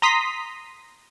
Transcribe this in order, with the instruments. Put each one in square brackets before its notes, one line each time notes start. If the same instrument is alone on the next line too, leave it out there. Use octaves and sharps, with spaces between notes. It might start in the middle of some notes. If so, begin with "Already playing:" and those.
[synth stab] A#5 C6 D#6 B6